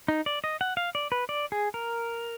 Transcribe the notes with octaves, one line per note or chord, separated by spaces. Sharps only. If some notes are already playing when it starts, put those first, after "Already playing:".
D#4
D5
D#5
F#5
F5
D5
B4
D5
G#4
A#4